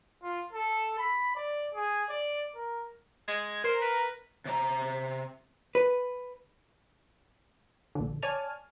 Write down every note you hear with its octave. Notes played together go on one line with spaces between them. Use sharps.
F4
A4
B5
D5
G#4
D5
A#4
G#3 G#6
A#4 C5
B4
C3 D5 A#5
B4
A#1 D3
C#5 D5 G#5 A5 F6